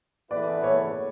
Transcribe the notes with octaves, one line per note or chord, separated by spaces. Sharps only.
E2 D3 A3 E4 B4 D5
C#5